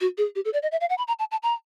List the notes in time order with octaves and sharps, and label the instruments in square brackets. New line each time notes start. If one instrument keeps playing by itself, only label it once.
[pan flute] F#4
G#4
G4
A4
D5
D#5
E5
F5
F#5
B5
A#5
A5
A5
A#5